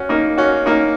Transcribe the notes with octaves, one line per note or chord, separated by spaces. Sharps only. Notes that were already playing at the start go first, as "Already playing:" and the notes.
Already playing: C#4 F#4
A#3 D#4
C#4 F#4
A#3 D#4